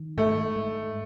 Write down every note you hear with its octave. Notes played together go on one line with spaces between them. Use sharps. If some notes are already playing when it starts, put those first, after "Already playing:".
Already playing: D#3
G#2 A3
G#3